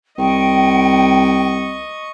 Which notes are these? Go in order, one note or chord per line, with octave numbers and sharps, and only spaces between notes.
C2 D#5 G5 C#6